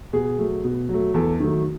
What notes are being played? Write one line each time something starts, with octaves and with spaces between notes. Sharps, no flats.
B2 G#4
F#3 A3
B2
F#3 A3
E2 A4
D#3 F#3 A3